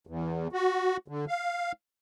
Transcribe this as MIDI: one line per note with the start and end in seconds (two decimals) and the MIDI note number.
0.07 0.48 40
0.53 0.97 66
1.08 1.25 50
1.28 1.72 77